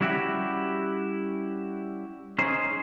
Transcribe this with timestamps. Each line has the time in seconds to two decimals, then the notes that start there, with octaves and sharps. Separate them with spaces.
0.01 G3 C#4 E4 F#4 G4
2.39 C#4 D#4 G#4 C5